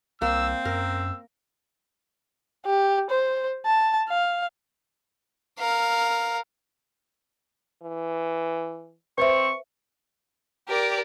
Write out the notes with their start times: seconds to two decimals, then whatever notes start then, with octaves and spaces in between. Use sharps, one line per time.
0.22 C2 A#3 C4 E6
0.65 F#2 A#4 E6
2.66 G4
3.10 C5
3.65 A5
4.09 F5
5.58 A#4 F5
7.83 E3
9.18 C4 B4 C5 E5 C#6
10.69 G4 A#4 D5